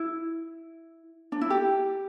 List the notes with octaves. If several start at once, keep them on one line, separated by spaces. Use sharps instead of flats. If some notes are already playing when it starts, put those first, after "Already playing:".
Already playing: E4
D4
E4
G4